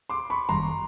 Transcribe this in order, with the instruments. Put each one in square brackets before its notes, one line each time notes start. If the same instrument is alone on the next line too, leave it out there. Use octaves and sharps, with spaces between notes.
[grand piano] C6 D6
B5 C#6
[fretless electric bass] F#1 F#2 D#3 G3 [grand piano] A#5 C6